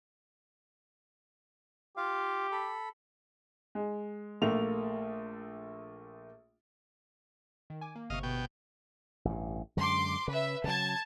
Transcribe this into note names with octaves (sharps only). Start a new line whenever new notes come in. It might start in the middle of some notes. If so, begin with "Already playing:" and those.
F4 G4 F5
A4 B5
G#3
A#1 A3 A#3 F7
D#3
G#5 D6
A#3
G1 C3 D#5 F5 C#6
B2 G5
A1 G2
F#2 D3 G#3 C6 D6
C#3 B4 E5
C#3 F#3 A5 G#6